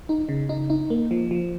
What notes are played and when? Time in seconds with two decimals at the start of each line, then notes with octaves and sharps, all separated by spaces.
0.09 D#4
0.29 C#3
0.49 D#4
0.70 D#4
0.90 A#3
1.11 F3
1.31 F3